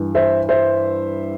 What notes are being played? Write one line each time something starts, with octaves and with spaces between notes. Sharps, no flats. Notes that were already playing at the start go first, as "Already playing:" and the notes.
Already playing: G2 E3
C5 E5
C5 E5